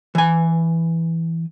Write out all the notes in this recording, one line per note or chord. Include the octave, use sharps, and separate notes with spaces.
E3 G#5